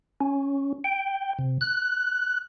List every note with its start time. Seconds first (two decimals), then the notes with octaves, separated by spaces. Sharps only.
0.21 C#4
0.84 G5
1.39 C3
1.61 F#6